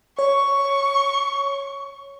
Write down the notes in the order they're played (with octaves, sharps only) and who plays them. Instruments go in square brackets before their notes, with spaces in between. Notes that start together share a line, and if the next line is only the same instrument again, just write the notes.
[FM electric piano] C#5 [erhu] C#6